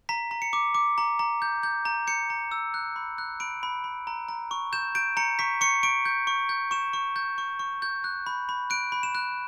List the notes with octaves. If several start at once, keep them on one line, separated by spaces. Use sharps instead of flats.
A#5 B6
A#5
C#7
D6
D6
A#5
A#5
G6
G6
A#5
G6 C#7
A#5
E6
F#6
B5
F#6
B5 D7
B5
B5
A#5
A#5
C#6
G6 E7
G6 D7
A#5 C#7
C#6 B6
C#6 C#7
C#6 D7
G6
C#6
G6
C#6 E7
C#6
G6
C#6
C#6
G6
F#6
B5
B5
F#6 D7
B5
E7
F#6